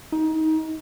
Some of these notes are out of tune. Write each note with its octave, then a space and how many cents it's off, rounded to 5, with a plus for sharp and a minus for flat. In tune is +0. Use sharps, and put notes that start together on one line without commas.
D#4 +25